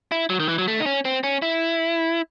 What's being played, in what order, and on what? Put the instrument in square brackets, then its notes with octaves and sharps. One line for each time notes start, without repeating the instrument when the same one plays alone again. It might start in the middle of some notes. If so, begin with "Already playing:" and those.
[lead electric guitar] E4
F#3
D#3
E3
F#3
A3
D#4
C#4
C4
C#4
E4